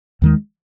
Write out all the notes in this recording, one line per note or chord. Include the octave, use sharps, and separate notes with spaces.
D#2 D#3 G#3